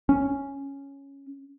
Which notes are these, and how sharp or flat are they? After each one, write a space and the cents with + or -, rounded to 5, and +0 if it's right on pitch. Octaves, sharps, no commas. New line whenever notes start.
C#4 +0